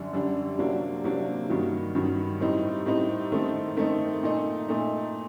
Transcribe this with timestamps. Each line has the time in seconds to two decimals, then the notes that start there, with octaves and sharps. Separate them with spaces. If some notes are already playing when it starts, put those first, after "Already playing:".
Already playing: F#2 D3 G3 D4
0.13 F#2 D3 G3 D4
0.58 C3 F#3 A#3 D4
1.04 C3 F#3 A#3 D4
1.49 G2 D#3 F#3
1.95 G2 D#3 F#3
2.40 A2 G3 C4 D#4
2.86 A2 G3 C4 D#4
3.32 D#3 A3 C4 D#4
3.77 D#3 A3 C4 D#4
4.23 A#2 A3 D#4
4.68 A#2 A3 D#4